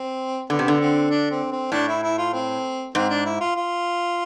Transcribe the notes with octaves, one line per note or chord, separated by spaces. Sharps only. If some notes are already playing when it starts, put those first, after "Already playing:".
Already playing: C4
D3 B3
C3
D3
C4
D4
C4
C4
A2 D4
E4
E4
F4
C4
G#2 C4
D4
E4
F4
F4